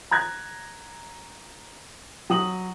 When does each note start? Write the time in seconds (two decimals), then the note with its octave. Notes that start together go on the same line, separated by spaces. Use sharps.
0.11 A#5 F#6 G#6
2.30 F#3 D#6 F#7